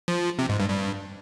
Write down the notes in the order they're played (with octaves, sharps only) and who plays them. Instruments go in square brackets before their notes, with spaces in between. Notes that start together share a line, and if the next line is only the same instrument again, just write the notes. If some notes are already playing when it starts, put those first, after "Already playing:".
[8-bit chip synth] F3
C3
G#2
G2
G2